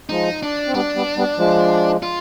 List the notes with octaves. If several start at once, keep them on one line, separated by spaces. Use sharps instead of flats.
F3 G#3 D#4
D4
C4
G3 B3 D4
G3 B3
G3 B3
F3 G#3
F4